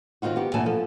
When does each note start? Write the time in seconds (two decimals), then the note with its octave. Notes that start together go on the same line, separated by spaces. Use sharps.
0.22 D#3 C4 D#4 F4 F#4
0.36 B3 G4
0.54 D2 A#2 E3 F#3 G#5 A5
0.66 F3 A4